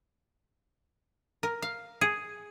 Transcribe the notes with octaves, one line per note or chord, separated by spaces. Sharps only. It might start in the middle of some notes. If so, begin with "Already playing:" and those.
A#4
F5
G#4